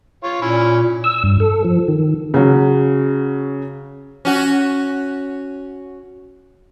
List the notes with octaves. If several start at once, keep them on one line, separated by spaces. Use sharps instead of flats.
F4 C#5
A#2 C#4 E4
E6
G2
A4
F3
D#3
C#3 F#3
C#4 F#4